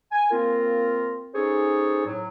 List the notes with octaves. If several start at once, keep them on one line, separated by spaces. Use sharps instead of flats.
G#5
A#3 C4 F4 A#4
C#4 D#4 G#4 A4 C5 C#5
A2 F#3